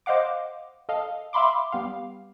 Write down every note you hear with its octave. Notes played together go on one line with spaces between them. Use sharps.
C5 D#5 F5 F#5 D6
A4 D#5 F5
E5 F5 B5 C6 D6
G3 B3 G4 F5